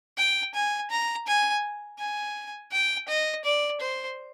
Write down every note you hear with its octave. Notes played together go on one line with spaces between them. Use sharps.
G5
G#5
A#5
G#5
G#5
G5
D#5
D5
C5